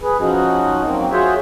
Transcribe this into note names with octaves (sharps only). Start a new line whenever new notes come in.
G#4 B4
F3 C#4 D#4 F#4
F#3 A#3 C4
F4 F#4 G#4 C5 C#5 E5